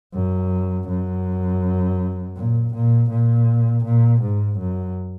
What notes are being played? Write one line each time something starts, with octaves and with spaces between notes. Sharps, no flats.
F#2
F#2
A#2
A#2
A#2
A#2
G#2
F#2